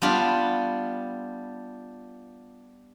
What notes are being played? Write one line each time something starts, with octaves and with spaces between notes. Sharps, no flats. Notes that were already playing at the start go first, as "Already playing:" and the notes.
G3 B3 D4 F4